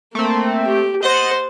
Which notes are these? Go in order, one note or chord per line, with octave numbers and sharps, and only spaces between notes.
A3 A#3 C4
G4
C5 D#5 F#5 A6